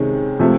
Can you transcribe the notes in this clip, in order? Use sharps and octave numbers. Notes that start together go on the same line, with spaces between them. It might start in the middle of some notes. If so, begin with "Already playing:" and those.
Already playing: C3 D#3 G#3 C#4
C3 F3 A3